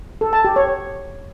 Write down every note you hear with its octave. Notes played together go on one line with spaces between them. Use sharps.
A4
A5
G4
C#5